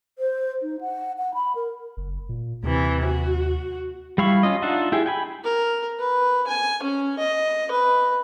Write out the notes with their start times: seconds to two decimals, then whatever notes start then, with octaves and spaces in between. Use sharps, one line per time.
0.19 C5
0.62 D#4
0.81 F#5
1.18 F#5
1.34 B5
1.55 A#4
1.97 F#1
2.29 A#2
2.63 D#2 C3 E3
3.04 F#4
4.18 G3 E4 F5 B5 C#6
4.43 C#4 F4 D#5
4.62 D4 D#4 F4 E5 F#5
4.92 E4 G4 G#4
5.06 G5 G#5 B5
5.44 A#4
5.99 B4
6.48 G#5
6.83 C#4
7.19 D#5
7.72 B4